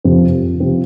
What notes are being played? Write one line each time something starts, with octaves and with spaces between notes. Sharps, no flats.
F2 C3 F3 C4
C3 F3 C4